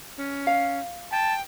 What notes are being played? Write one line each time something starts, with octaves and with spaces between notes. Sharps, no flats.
C#4
F5
G5 A5